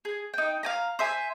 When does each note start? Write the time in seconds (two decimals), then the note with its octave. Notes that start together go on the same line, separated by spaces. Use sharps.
0.05 G#4
0.34 D#4 G5
0.63 F5 G#5 A#5
0.99 C5 E5 G#5